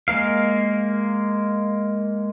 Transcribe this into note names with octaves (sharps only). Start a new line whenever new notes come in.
G#3 A#3 A#4 F5